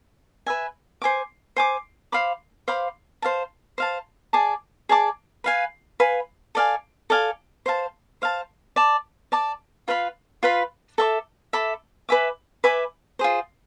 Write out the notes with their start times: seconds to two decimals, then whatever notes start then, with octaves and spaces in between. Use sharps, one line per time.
0.46 B4 E5 G#5
1.02 C5 G#5 D6
1.56 C5 G#5 D6
2.12 C5 F5 B5 D6
2.68 C5 F5 B5 D6
3.22 C5 F5 A5
3.78 C5 F5 A5
4.33 G#4 D5 A5 D6
4.89 G#4 D5 A5 D6
5.44 B4 F5 G#5
6.00 B4 F5 G#5
6.55 A4 D5 F5 G#5
7.10 A4 D5 F5 G#5
7.66 C5 F5 A5
8.22 C5 F5 A5
8.76 D5 A5 D6
9.32 D5 A5 D6
9.88 F4 B4 F5 B5
10.43 F4 B4 F5 B5
10.98 A4 E5 B5 D6
11.53 A4 E5 B5 D6
12.09 B4 E5 G#5 D6
12.64 B4 E5 G#5 D6
13.19 F4 G#4 C5